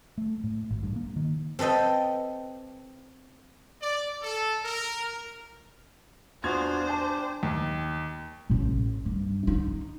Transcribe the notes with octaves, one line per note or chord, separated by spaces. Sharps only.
A3
A2
G#1
G2
A#3
D#3
C4 A4 B4 D#5 G5
D5
A4
A#4
E2 B3 D4 F4 F#4 C5 G#6 F7
G4 G#5 A5
D#2
A1 A2
G2
D#4